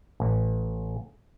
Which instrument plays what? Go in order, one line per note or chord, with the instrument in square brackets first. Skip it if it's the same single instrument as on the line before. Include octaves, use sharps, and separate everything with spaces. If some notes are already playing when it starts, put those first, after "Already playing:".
[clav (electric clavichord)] A1